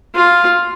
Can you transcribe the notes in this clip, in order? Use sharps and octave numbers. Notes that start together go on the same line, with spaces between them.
F4